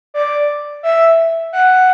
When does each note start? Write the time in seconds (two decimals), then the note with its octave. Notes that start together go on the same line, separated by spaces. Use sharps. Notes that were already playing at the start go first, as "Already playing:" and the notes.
0.14 D5
0.83 E5
1.53 F#5